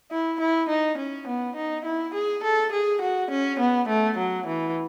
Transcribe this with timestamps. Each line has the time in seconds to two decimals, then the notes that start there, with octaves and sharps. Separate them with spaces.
0.11 E4
0.40 E4
0.69 D#4
0.98 C#4
1.27 B3
1.56 D#4
1.85 E4
2.14 G#4
2.44 A4
2.72 G#4
3.02 F#4
3.31 C#4
3.60 B3
3.88 A3
4.18 F#3
4.47 E3